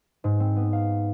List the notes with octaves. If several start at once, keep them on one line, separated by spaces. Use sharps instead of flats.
G#2
C4
B3
F5